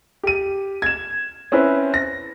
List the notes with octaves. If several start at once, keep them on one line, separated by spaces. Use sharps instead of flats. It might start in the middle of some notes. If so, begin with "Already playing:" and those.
G4 D#7
G#6 E7
C4 C#4 E4 B4 C5
A#6